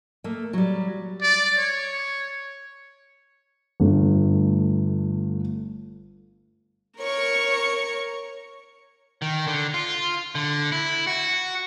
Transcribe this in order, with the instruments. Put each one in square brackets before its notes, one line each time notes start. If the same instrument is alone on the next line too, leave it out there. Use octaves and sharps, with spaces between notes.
[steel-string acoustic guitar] A3 A#3
F#3 G3
[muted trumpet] D5
C#5
[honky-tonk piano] G1 A3
[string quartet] A#4 C#5 C#6
[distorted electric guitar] D#3
D3
F4
D3
E4
F#4